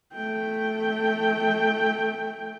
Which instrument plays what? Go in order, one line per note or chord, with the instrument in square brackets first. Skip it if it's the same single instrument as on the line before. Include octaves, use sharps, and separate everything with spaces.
[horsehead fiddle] A3 G5